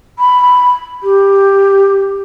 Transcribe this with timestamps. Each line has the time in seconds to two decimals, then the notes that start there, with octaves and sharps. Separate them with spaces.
0.19 B5
1.03 G4